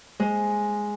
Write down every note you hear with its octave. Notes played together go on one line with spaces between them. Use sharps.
G#3